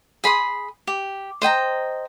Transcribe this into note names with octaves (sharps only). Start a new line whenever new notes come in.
G#4 B5 C6 D#6
G4
C5 D#5 G5 A#5